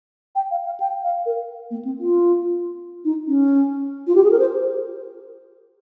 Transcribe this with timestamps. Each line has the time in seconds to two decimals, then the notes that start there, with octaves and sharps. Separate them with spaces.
0.35 G5
0.51 F5
0.66 F5
0.80 G5
1.03 F5
1.26 A#4
1.71 A#3
1.85 C4
2.00 F4
3.05 D#4
3.28 C#4
4.07 F4
4.15 G4
4.24 G#4
4.31 A#4
4.39 C5